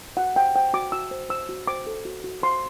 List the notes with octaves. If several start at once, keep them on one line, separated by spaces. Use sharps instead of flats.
F#4 F#5
C5 G5
C5 G5
F#4 D6
F#4 E6
C5
C5 E6
F#4
C5 D6
A4
F#4
F#4
C5 C6